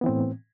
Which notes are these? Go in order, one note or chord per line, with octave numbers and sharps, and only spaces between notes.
A2 E3 B3 C4